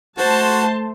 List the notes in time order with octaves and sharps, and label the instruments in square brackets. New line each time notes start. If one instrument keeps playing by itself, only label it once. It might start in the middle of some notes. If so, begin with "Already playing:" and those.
[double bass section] A3 [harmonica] F#4 [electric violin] C5 [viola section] A5 C6